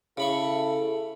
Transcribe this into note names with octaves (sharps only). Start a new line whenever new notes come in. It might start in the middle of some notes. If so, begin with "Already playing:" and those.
C#3 E4 A4 B5 C#6